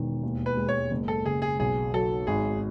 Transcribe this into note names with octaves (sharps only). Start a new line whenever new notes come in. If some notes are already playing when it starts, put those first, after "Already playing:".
Already playing: E1 D#3
D#2
B4
G#3
C#5
F#1
A4
C#3 G#4
G#4
B1 G#4
F#3 A4
G#1 G#4